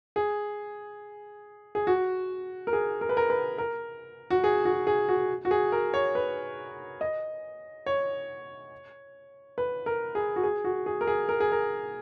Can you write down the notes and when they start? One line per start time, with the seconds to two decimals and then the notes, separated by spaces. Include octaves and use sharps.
0.16 G#4
1.75 G#4
1.87 F#4
2.67 A#4
2.73 G#4
3.01 A#4
3.09 B4
3.17 A#4
3.30 B4
3.58 A#4
4.30 F#4
4.44 G#4
4.65 F#4
4.87 G#4
5.08 F#4
5.45 F#4
5.51 G#4
5.72 A#4
5.94 C#5
6.15 B4
7.01 D#5
7.86 C#5
9.58 B4
9.86 A#4
10.15 G#4
10.36 F#4
10.43 G#4
10.64 F#4
10.86 G#4
11.01 A#4
11.07 G#4
11.29 A#4
11.40 G#4
11.52 A#4